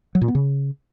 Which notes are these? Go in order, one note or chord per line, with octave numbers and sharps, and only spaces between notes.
F#3
A#2
B3
C#3